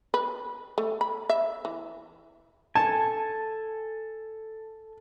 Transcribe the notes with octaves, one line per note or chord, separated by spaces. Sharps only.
B4
A3
B5
E5
E3
A4 G#5 A5